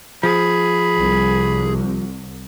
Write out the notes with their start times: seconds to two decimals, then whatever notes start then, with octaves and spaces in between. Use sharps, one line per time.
0.23 F3 G#4 B5
0.96 C2